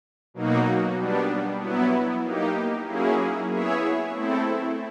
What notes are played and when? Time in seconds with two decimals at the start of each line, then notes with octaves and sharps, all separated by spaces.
0.34 B2 F#3 A#3 D#4 F#4
0.96 G3 B3 D4
1.60 F#3 B3 E4
2.24 A#3 D#4 G4
2.87 F#3 A#3 C#4 E4 G#4
3.51 B3 E4 G#4 C#5 E5
4.14 A3 C4 E4 A4